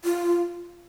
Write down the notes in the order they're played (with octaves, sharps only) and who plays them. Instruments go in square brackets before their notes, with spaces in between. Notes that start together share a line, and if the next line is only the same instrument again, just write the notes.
[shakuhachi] F4